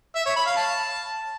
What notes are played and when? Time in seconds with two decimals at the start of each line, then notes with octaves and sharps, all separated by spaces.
0.15 E5
0.25 C#5
0.36 B5
0.46 F5
0.56 A5